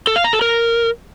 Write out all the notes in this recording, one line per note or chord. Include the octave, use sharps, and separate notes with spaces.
A4
F5
A#5
A4
A#4